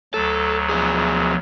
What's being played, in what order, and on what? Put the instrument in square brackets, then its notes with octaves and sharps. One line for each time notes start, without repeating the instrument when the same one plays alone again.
[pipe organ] D2 F#3 [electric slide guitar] A4
[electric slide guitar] B2 F3 G#4